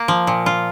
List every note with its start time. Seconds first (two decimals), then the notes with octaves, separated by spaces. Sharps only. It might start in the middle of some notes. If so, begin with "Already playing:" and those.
Already playing: A#3
0.08 F3
0.27 A#2
0.46 F4